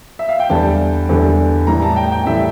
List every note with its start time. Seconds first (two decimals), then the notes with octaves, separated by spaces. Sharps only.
0.19 E5
0.29 F5
0.40 G5
0.50 E2 D3 G3 A5
1.09 E2 D3 G3
1.67 A2 E3 G3 A#5
1.82 A5
1.96 G5
2.12 G5
2.26 A2 E3 G3 E5